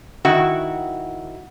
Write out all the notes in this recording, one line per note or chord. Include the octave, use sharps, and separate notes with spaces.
D#3 E4 F#4